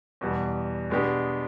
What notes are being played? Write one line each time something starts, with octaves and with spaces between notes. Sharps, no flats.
E2 B2 G3
B2 G#3 B3 D4 G4